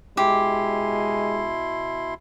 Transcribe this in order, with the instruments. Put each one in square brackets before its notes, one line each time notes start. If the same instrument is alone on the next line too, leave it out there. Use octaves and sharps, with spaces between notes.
[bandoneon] B2 E4 C6 [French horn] G#3 [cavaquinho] G4